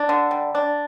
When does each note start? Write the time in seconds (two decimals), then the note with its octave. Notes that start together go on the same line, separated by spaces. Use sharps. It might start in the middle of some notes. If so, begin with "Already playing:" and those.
Already playing: D4
0.09 D3
0.31 G3
0.55 D4